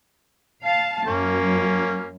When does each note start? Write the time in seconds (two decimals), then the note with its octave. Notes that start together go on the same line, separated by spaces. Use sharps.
0.64 F5 A5
1.07 F#2 A#3 C#4